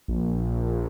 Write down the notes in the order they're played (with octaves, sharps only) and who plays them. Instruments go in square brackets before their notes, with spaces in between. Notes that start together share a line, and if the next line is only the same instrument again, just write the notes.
[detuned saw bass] A#1